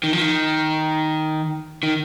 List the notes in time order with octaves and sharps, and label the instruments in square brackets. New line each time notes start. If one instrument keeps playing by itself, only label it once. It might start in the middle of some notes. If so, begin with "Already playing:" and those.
[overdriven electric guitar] D#3
F3
D#3
D#3